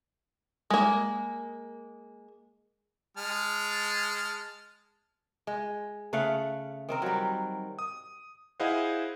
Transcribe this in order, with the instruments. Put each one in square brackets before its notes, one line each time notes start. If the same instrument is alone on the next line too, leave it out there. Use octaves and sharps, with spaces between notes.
[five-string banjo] G#3 A#3
[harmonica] G#3 A5 F6
[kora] G#3
C#3 A3 F5 F#5
D#3 C4 A#4
F#3 G3
[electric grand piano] D#6
E4 G#4 C5 D#5 F5 F#5